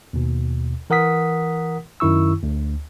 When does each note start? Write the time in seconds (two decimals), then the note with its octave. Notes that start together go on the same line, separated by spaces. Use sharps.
0.13 D#2 B2
0.90 E3 A#4 F#5 D#6 B6
2.00 F#2 D#3 E4 C#6 E6
2.43 D2